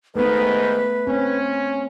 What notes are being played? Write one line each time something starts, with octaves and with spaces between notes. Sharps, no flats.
G#2 D#3 A3 B3 B4
C4 C#4